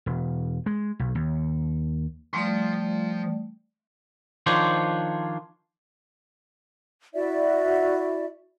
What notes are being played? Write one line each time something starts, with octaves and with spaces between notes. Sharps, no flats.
E1
G#3
B1
D#2
F3 G3 A3 D5 C6
D#3 F3 D4 C5 C#5
E4 F#4 D5 E5